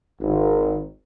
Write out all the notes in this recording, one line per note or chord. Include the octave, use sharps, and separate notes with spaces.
G#1